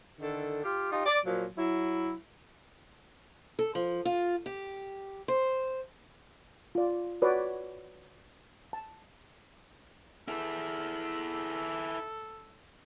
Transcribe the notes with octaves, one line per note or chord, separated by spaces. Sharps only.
D3 D#3 A4
F4 G4
D#4 F4 G4
D5
A#2 F3 F#3
F#3 E4
A4
F3
F4
G4
C5
F4 D5
F#4 B4 C#5 D5
A5
E4 G#4 A4